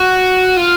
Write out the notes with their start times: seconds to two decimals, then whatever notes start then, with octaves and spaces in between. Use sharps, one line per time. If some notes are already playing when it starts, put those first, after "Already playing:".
Already playing: F#4
0.57 F4